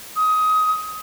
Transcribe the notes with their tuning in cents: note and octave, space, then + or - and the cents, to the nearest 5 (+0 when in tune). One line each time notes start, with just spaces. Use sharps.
D#6 +20